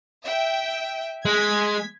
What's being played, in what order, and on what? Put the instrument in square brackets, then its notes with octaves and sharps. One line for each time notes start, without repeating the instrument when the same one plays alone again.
[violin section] E5 G5
[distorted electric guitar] G#3 [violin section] G#6 B6